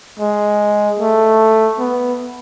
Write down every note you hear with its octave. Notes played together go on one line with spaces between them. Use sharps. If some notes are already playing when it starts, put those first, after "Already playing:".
G#3
A3
B3